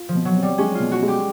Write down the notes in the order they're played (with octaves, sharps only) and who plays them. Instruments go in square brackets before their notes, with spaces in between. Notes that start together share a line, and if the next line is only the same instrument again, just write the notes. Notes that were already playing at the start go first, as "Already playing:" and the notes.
Already playing: [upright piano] F4
[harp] F3
[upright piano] B2
[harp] F#3
[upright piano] C4
[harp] G3
[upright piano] G#3 [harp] C#4
[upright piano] B2 [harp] F4
[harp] F#4
[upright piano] G#3
[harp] G4